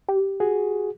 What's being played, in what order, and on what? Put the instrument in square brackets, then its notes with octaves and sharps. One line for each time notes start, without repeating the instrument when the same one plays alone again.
[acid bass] G4
[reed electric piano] F#4 G#4